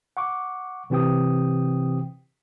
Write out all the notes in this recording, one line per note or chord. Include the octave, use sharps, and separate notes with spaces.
F#5 C#6 D6
C3 E3 C4 G4 G5 D#6